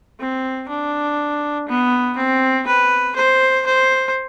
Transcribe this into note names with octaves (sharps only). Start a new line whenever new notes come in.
C4
D4
B3
C4
B4
C5
C5